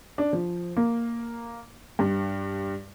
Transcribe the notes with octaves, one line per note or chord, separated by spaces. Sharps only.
D4
F3
A#3
G2